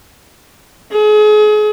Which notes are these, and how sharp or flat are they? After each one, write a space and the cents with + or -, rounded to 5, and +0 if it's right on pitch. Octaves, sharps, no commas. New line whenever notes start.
G#4 +35